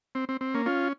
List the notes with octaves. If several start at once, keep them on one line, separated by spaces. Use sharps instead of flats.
C4
C4
C4
A#3 C#4
C#4 F4